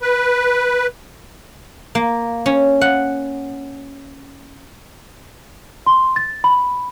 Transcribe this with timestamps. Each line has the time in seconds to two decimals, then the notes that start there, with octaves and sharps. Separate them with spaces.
0.01 B4
1.95 A#3
2.46 C#4
2.81 F#5
5.86 C6
6.16 A6
6.44 B5